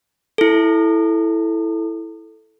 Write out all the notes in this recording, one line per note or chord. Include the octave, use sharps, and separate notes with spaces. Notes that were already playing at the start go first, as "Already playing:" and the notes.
E4 A4